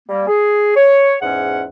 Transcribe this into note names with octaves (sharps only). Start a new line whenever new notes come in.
G3 A#3
G#4
C#5
E2 G#2 C#4 G#4 E5 F#5